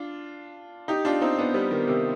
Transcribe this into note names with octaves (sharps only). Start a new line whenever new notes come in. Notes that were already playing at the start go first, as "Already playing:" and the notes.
Already playing: D4 F4
D#4 G4
D4 F4
C4 D#4
B3 D4
G3 B3
D#3 G3
C3 D#3